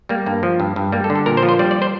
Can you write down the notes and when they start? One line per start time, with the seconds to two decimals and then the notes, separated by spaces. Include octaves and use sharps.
0.09 G3 A#3
0.26 G2 A#3
0.43 F3
0.60 G2
0.76 G2
0.92 G3 A#3
1.04 A4
1.10 D3
1.15 A4
1.26 A#2 A#4
1.37 C5
1.43 F3
1.49 C5
1.59 G3 D5
1.71 D5
1.82 C5